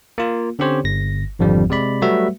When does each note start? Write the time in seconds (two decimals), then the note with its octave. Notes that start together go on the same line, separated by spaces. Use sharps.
0.18 A#3 F4
0.59 D3 C4 C#4 G4 C5 C#5
0.84 G1 A#6
1.39 G#1 F2 D3 F3 G3
1.70 C3 G#3 D5 B5
2.01 F#3 G3 A3 F#4 B4 E5